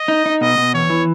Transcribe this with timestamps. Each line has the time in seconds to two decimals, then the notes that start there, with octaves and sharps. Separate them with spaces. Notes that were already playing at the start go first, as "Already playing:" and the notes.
Already playing: D#5
0.08 D#4
0.26 D#4
0.41 B2 D#5
0.58 B2
0.74 E2 C#5
0.90 E3